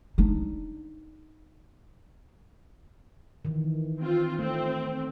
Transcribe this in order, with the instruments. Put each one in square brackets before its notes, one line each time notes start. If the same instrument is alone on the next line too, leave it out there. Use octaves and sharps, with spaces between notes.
[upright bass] D4 D#4
[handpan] D#3 E3
[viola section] C4 F4
[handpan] A3 [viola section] C4